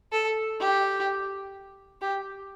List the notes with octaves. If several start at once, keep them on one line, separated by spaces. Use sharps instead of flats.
A4
G4
G4